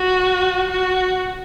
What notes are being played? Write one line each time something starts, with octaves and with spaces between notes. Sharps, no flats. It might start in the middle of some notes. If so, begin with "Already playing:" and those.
Already playing: F#4
F#4